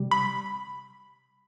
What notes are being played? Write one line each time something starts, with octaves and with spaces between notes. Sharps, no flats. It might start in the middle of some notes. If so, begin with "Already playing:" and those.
Already playing: C3 G3
B5